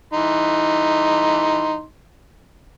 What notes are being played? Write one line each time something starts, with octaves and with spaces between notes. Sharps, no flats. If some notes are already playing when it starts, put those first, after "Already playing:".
E3 D#4 C6